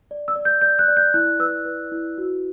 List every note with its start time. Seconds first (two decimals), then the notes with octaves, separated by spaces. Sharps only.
0.11 D5
0.28 E6
0.36 D5
0.45 G6
0.61 D5 G6
0.79 F#6
0.88 D5
0.97 G6
1.14 E4 F#6
1.40 B4 E6
1.65 B4
1.92 E4
2.18 F#4